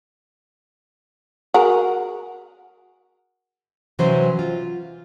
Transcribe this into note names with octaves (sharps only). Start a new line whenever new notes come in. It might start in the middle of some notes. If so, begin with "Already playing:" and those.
F#4 G#4 A#4
C3 E3 F#3 C#4 C5
F4